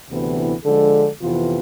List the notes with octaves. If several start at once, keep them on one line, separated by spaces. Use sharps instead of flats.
D2 C3 E3 B3 E4
D3 F3 G#3 D4 A4
F2 C3 E3 B3 F4